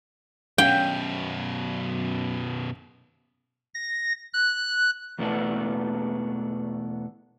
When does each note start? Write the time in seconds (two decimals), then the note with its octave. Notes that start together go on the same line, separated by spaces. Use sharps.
0.58 F#2 B2 C#4 F5 G5
3.74 A#6
4.33 F#6
5.19 E2 B2 E3 A3 B3 D4